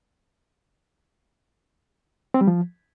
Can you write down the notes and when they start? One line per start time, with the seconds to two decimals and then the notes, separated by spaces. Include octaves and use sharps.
2.34 C4
2.41 G3
2.47 F3